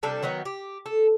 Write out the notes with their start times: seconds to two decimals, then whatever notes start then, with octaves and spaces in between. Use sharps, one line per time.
0.03 C3 G3 D4 A4
0.23 D#3 F#3 B3 D#4
0.45 G4
0.86 A4